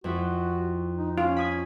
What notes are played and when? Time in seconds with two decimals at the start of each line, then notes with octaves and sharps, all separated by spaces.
0.04 F2 E4 F#4
0.98 D#4
1.18 C#4 F4
1.36 B5 D#6 G#6